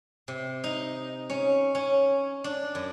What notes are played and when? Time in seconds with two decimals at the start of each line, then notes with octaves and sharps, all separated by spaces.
0.28 C3
0.64 D#4
1.30 C#4
1.75 C#4
2.44 D4
2.75 F#2